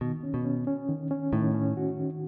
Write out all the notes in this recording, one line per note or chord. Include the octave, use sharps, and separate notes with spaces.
B2 D#3
C#4
B2
C#4
C#4
D#3
C#4
A2 D#3
C#4
F#4
D#3